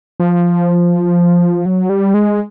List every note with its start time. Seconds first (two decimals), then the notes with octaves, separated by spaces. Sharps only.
0.20 F3
1.66 F#3
1.89 G3
2.14 G#3